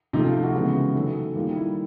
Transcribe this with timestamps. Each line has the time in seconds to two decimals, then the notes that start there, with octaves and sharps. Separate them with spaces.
0.13 C3 F3 A3 D#4
0.23 F4
0.44 F#4
0.54 C#3 E3 G#3 B3
0.94 D#3 F#3 A3
1.36 D#3 G3 A#3 F4
1.56 E4